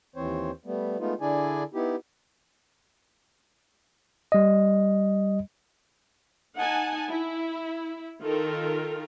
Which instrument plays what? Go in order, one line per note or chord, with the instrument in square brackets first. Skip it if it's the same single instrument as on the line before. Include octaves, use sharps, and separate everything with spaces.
[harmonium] D#2 E3 C4 C5 C#5
G3 A3 B3
G#3 A3 B3 D#4 F4
D3 D4 E4 G#4 D5 G#5
B3 D#4 E4 G4
[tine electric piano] G3 D#5
[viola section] D#4 F#5 G#5 A5
E4
D#3 F4 A4 A#4